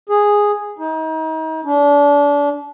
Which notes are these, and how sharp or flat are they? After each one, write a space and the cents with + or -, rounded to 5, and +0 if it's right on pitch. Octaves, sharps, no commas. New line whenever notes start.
G#4 -5
D#4 +35
D4 -30